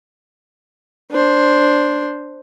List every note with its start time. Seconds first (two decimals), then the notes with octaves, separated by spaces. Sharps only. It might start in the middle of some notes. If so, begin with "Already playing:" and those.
1.11 D4 C5